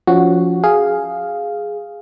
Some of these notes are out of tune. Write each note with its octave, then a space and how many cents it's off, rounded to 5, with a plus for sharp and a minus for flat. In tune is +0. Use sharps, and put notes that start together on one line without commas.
F3 +0 C#4 +25 F#4 +0
G#4 +0 F5 +0